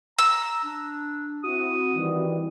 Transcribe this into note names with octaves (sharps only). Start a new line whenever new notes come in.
A#5 E6
D4
C4 E4 F#4 D#6
D#3 E3 G3